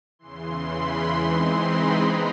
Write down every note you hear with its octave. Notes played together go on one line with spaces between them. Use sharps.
E2 C#3 E3 C6
B5
E3 G#3 C4 D#4 C6
B5
G#3 B3 A#5